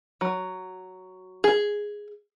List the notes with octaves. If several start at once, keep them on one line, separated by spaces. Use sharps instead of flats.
F#3
G#4